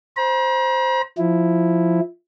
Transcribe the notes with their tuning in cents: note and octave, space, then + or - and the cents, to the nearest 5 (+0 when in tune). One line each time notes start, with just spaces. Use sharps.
C5 +0 A#5 +45
F3 +0 E4 +0